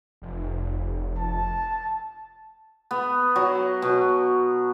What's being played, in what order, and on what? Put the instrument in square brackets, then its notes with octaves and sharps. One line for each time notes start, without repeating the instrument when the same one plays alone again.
[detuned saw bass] F1
[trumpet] A5
[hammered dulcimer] B3
F#3
B2